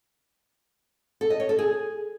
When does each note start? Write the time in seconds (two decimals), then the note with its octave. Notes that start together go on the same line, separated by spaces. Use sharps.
1.21 A4
1.30 D#5
1.40 C#5
1.49 A4
1.59 G#4